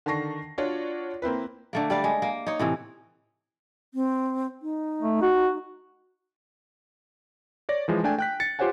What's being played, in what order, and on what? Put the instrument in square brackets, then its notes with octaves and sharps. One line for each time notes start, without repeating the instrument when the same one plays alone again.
[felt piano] D3 D#3 A5 C#6 A#6 C7
D4 F4 F#4 C#5 D5
A#3 C4 E4 B4
[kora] D3 A3 A#3
G3 D5 F5
G#3
A#3
D#4 C#5
A2 C3 E3
[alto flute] C4
D#4
[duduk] A3
F#4
[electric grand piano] C#5 D5 A#6
E3 F3 G#3
A3 D4 G5 G#5
G5 F#6 B6
A6 C#7
F4 G4 C5 C#5 F#5 G#5